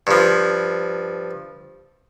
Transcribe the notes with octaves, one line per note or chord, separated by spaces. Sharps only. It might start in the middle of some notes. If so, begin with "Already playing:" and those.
G2 F3